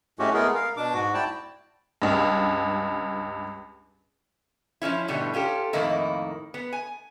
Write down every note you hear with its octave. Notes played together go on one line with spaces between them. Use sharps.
A2 G#3 A3 C#4 F#4 G4
G#3 A3 B3 G#4 A#4
A#4 F5
B2 D4 D6
G#2 F#4
E4 D5 G5 A5
C#2 G2
F3 F#3 C#4 E4
G#2 B2 D3 G3 A3 E4
C#4 F4 G4 A4
F2 A2 D#3 A#3 D#4 E4
B3
G#5